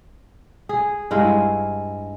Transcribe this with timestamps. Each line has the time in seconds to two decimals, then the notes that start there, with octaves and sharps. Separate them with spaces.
0.69 G#4
1.11 G2 G#3 E4 F5